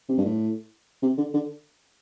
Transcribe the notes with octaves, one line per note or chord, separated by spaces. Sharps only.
C3
G2
A2
C3
D3
D3